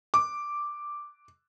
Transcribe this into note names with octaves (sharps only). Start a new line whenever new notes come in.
D6